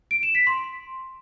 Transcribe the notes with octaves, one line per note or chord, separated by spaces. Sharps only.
D7
E7
B6
C6